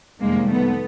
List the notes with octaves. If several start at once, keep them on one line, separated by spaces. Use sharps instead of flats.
F2 C3 D#3 G3 G#3 A#3
A3 B3